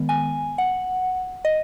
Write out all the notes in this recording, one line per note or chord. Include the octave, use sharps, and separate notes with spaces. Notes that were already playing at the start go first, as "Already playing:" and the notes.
Already playing: D#3 G#3 B3
G#5
F#5
D#5